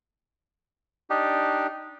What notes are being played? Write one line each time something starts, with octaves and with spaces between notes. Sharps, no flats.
D4 D#4 G4